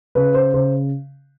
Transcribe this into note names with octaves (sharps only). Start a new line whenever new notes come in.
C#3 B4
C5
C#3 C5